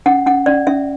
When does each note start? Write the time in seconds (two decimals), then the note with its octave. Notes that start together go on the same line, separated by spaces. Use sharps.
0.06 C#4 F#5
0.26 C#4 F#5
0.46 C#4 D5
0.67 C#4 E5